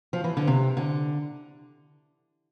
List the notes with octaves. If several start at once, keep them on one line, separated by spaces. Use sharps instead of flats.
F3
E3
D3
C3
D3